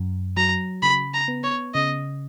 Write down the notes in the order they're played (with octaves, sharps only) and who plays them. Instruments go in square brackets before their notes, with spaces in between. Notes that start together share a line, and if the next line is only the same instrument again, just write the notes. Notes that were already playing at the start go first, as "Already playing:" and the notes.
Already playing: [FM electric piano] F#2
[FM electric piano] F#3 [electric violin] A#5
[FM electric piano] C#3 [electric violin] B5
[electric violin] A#5
[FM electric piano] B3
[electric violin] C#5
[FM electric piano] C#3 [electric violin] D#5